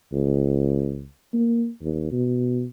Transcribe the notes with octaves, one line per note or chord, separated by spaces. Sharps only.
C#2
A#3
D#2
B2